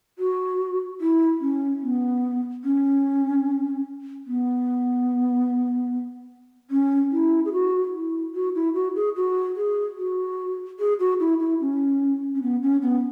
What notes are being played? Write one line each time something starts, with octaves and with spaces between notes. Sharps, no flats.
F#4
E4
C#4
B3
C#4
B3
C#4
E4
G#4
F#4
E4
F#4
E4
F#4
G#4
F#4
G#4
F#4
G#4
F#4
E4
E4
C#4
C#4
B3
C#4
B3